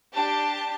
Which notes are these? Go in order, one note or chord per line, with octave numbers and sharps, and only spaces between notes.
D4 G4 A5